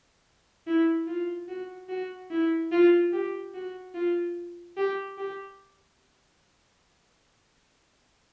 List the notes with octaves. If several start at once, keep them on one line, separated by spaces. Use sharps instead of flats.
E4
F4
F#4
F#4
E4
F4
G4
F#4
F4
G4
G4